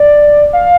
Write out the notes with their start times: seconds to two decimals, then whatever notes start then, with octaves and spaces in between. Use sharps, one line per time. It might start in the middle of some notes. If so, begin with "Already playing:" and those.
Already playing: D5
0.53 F5